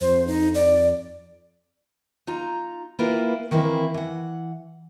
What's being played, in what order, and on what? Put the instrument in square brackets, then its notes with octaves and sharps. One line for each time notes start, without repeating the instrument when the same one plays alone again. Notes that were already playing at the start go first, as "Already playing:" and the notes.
[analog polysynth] F2 [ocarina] C5
[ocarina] D#4
D5
[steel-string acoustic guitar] D#4 F4 A#5
A#3 E4 F4 G4 A#4 B4
D#3 E3 A#3 C4 E4
E3 F#5